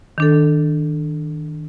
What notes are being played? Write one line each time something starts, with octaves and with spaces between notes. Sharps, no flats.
D#3 D4 A4